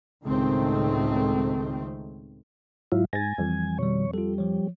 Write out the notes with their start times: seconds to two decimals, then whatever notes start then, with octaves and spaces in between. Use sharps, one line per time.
0.24 C#2 A2 D#3 A3 C4
2.92 G#2 F#3 E4 F4
3.13 G#2 G#5 A6 A#6
3.38 F2 E3 G3
3.78 B2 D#3 G3 C#5
4.13 G3 F4 A4
4.38 F3 C#5